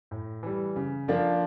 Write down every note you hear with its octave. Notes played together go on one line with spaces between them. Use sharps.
A2
E3 G3
C#3
F3 A#3 D4 F4